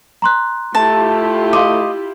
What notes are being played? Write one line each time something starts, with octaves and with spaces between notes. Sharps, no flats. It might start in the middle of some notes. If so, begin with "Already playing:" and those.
A#5 C6 F#6
A3 E4 F4 G4 A5
D#5 F5 C6 D6